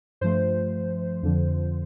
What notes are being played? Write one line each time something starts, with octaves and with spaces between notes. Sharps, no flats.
G2 F3 A3 C5
F2 D3 F3